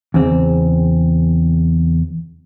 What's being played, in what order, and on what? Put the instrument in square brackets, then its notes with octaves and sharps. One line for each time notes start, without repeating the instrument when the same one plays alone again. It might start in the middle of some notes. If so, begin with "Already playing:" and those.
[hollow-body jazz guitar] E2 C#3 C4